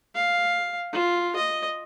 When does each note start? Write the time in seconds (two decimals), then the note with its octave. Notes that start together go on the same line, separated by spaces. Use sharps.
0.15 F5
0.92 F4
1.36 D#5